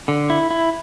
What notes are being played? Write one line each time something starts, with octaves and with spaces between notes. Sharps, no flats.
D3
E4
E4